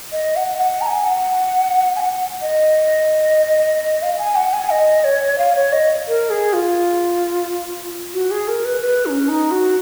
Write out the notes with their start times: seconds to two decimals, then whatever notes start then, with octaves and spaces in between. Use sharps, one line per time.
0.12 D#5
0.36 F#5
0.58 F#5
0.81 A#5
0.86 G#5
1.04 F#5
1.96 G#5
2.00 F#5
2.42 D#5
4.02 F5
4.19 G#5
4.36 F#5
4.53 G#5
4.70 D#5
5.04 C#5
5.38 F5
5.56 C#5
5.73 D#5
6.08 A#4
6.30 G#4
6.53 F4
8.14 F#4
8.31 G#4
8.48 A#4
8.65 B4
8.82 B4
9.06 D#4
9.09 C#4
9.29 D#4
9.51 F#4